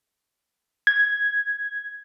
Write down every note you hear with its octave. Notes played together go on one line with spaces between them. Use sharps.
G#6